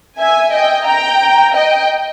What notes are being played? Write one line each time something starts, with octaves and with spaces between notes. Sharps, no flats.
E5 G#5
D#5 G5
G5 A#5
D#5 G5